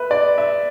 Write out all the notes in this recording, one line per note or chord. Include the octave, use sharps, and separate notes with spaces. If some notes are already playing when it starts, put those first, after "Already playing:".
Already playing: B4 E5
D5
E5